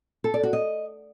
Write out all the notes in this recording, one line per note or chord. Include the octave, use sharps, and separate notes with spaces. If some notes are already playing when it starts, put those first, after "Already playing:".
A4
D5
F#4
D#5